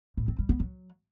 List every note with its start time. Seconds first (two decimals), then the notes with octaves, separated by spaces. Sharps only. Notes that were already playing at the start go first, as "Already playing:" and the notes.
0.17 A2
0.28 C4
0.39 G3
0.49 B3
0.60 F#3